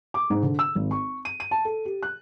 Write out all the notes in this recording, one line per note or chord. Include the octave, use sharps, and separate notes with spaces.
D6
G#2
D3
E6
G#1
C#6
D#7
D#7
A5
A4
G4
F#6